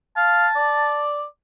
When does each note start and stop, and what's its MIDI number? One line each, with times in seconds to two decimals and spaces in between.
0.17 0.46 77
0.17 1.03 81
0.56 1.24 74